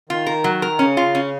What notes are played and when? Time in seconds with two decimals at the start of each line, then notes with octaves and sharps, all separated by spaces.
0.09 D#3 F4
0.26 A#4
0.44 F#3
0.62 A#4
0.79 C#3 C#4
0.97 F4
1.15 C#4